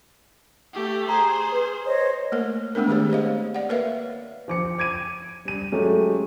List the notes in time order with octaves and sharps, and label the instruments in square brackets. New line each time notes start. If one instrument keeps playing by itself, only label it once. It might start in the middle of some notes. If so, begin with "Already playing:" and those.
[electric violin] A3 G4
[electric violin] G#4 C5 [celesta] A#5
[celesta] B4
[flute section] C5 C#5 D#5
[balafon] A3 A#3 A#4
G#3 A3 B3 C4 D4 A#4
D#3 A3 G4 G#4 C#5
G4 C5 D#5 F5
D5 F#5
A#3 A#4 B4 C#5 E5 F5
[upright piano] F3 D6 C#7
D6 G#6 D7 D#7
G3 D#7
F#3 G#3 A3 C#4 G4